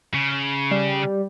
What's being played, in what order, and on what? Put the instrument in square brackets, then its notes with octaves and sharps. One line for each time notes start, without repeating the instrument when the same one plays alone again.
[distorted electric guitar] C#3
[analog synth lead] G3